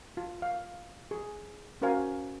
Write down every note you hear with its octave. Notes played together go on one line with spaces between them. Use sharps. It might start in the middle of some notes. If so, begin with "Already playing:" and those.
F4
F5
G#4
C#4 F#4 A#4 C5 F5 G#5